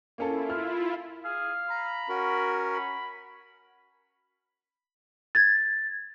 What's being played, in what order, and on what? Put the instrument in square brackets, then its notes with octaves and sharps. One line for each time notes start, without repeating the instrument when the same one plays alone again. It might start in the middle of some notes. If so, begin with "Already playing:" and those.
[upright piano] A#3 C#4 A4 [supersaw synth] E4 F4
[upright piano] F6
[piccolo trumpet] G#4 [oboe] F5
[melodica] A#5 [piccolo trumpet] B5
[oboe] C#4 [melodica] F#4 A#4
[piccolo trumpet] B5
[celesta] G#6 A6